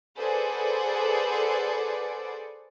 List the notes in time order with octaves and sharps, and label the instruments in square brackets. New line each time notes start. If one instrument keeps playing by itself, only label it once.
[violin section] G#4 A4 B4 C5 D5 F#5